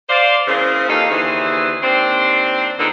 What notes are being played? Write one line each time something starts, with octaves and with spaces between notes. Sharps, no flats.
C5 D5 F5
C#3 E3 A#3 C4 G#4 C5
D#2 F3 D#4 A4 F5
D#2 D3 E3 E4 G#4 C5
D#2 C4 D4 C5
A#2 D3 G#3 B3 D#4 A#4